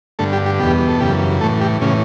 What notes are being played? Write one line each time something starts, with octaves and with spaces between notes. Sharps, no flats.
G2 D3 A3 A4
G3 G4
G3 G4
E2 B2 G3 G4
A4
F#2 C#3 E3 G3 G4
A2 E3 A3 A4
G3 G4
A2 C#3 E3 C#4